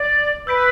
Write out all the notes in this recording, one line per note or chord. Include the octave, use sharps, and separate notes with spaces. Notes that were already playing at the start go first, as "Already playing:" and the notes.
Already playing: D5
B4 E6 G6 B6 D7